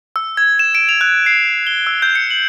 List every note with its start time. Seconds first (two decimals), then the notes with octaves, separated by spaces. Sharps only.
0.16 E6
0.37 G#6
0.59 E7
0.75 D7
0.89 F7
1.01 F#6
1.26 C7
1.67 G7
1.87 E6
2.02 G6
2.15 C#7
2.30 F#7